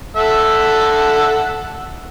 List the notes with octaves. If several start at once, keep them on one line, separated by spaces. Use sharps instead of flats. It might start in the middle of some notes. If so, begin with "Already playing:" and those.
A4 E5 F#5